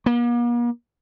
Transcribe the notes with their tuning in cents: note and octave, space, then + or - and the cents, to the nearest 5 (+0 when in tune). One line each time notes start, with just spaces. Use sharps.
A#3 +45